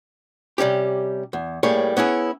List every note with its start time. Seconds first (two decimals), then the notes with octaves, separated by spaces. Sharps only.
0.58 C3 G3 C#4 G4
1.33 E2
1.63 A2 G3 A#3 G#4 C#5
1.97 B3 C#4 E4 G#4